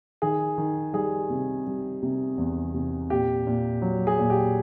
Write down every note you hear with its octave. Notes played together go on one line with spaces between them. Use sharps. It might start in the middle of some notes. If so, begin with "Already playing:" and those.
D#3 G#4
D#3
G3 G#4
C3
G3
C3
E2
C3
A#2 G4
A#2
F#3
G#4
A#2
G4